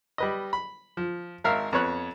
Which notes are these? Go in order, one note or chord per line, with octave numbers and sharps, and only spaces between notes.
G3 B4 D#5
B5
F3
G#1 A#4 E5 F5
F2 B3 C#5 F#6